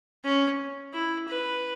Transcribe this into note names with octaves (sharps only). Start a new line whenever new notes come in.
C#4
E4
B4